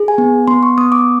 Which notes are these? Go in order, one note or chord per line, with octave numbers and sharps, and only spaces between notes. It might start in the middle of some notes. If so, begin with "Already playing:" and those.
Already playing: G#4
G#5
B3
B3 C6
C#6
B3 D#6
D6